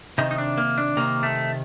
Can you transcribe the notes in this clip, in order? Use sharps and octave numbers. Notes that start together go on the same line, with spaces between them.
C3 D#3 D#4
D#4
D4
A#3
D4
C3 D#3 A#3
A3